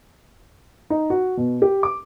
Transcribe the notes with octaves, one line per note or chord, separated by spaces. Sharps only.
D#4
F#4
B2
G4
D6